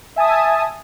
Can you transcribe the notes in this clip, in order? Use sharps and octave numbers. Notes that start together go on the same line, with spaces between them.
E5 G#5 A5 D#6